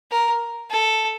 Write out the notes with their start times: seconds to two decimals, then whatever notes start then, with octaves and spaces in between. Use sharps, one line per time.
0.11 A#4
0.70 A4